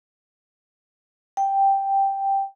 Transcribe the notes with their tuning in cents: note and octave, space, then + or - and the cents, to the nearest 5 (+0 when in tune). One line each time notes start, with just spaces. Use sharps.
G5 +0